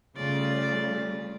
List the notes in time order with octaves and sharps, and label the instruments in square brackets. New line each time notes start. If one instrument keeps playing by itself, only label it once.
[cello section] C#3 G3 [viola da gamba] A3 [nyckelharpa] F4 D5